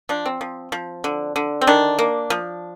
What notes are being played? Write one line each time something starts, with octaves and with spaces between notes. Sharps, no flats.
F3 D4
C4
F3
F3
D3
D3
C4
D#3 D4
A#3
F3